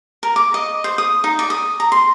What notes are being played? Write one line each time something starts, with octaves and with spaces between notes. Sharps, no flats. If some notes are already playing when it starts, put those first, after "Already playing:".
A#4
D6
D#5
C5
D#6
D#4
D5
D#6
A#5
C6